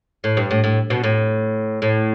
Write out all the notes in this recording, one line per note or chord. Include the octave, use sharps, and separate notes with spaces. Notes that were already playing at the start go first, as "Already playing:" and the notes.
A2
G2
A2
A2
B2
A2
A2